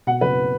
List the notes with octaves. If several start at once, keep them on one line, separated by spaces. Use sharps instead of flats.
B2 F#5
F#1 B4